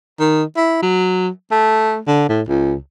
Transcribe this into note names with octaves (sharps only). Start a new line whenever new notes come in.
D#3
E4
F#3
A3
D3
A2
C#2